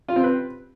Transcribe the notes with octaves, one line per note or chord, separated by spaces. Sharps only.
F4
C4
B4